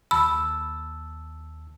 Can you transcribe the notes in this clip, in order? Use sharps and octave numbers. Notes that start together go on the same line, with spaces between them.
D#2 A5 B5 E6